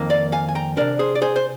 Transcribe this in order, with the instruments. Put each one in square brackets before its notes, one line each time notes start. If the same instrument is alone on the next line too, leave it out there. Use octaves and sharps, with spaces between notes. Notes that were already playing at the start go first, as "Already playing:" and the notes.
Already playing: [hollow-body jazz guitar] F2 D#3 A#3
D5 F5
F5 G#5
G#5
G5 A#5
C3 G3 D4 A#4 D5
G#4 C5
D5
G#4 C5
C5